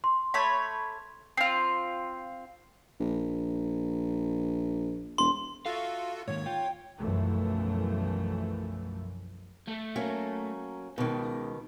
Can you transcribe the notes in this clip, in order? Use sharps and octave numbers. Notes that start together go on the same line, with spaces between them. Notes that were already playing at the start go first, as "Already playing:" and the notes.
C6
A3 C#5 B5
C4 F4 C7
A#1
E1 C6
F4 F#4 A4 E5 F5
G#2 D#3 A#3 C#5
F4 G5
B1 F#2 E3 F3 A3
A3
F#3 A#3 C#4
C#2 B2 D#3